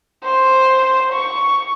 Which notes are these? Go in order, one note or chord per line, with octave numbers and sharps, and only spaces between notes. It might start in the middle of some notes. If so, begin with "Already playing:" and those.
C5
C#6